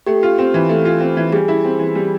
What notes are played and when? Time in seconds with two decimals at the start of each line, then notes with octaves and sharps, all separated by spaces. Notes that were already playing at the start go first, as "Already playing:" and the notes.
0.07 A3 G4
0.23 F4
0.38 C4
0.54 E3
0.69 A3
0.85 F4
1.00 C4
1.17 E3
1.32 G3 G#4
1.48 E4
1.64 C4
1.79 E3
1.95 G3